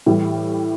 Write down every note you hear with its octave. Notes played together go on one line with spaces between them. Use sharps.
A2 E3 G3